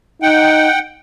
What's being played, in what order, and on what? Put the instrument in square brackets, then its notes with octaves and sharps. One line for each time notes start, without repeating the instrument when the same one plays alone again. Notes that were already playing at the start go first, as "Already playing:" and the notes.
[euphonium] D#4 [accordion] F#5 G5